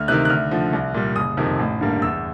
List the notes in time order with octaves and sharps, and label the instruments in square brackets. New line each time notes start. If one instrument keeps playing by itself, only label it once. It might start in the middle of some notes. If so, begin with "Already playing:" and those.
Already playing: [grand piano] D2 F6
C3 D#3 F#6
F#6
D2 F6
D3 F3
C2
A#2 G3
F#1 D#6
F2 C3 D#3
A1
G2 D3 G3 A#3
E2 E6